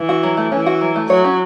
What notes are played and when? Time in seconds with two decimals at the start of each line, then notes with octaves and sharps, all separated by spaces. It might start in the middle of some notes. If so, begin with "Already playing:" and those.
Already playing: E3
0.09 F#4
0.23 F#3
0.37 A3
0.52 E3 C#4
0.66 F#4
0.81 F#3
0.96 A3
1.10 F#3 C#5
1.24 C#4